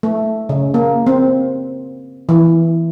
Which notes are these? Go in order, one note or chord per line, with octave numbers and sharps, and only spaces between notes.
A3
C#3
A#3
C4
E3